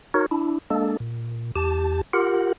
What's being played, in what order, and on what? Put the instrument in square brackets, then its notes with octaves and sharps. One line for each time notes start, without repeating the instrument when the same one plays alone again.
[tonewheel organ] D#4 F#4 A#4 C#5
D4 E4
G#3 A#3 D4 A4
A#2
E2 G4 A5
F4 G4 A#4 F#5